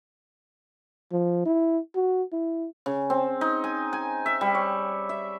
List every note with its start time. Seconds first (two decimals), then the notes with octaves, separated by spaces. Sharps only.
1.12 F3
1.46 E4
1.96 F#4
2.33 E4
2.86 C#3
3.10 C4
3.41 D#4
3.64 G#5
3.93 G#5
4.26 E5
4.41 G3
4.55 C#5
5.09 E5